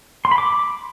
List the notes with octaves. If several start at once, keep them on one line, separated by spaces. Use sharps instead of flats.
C6
B5
D6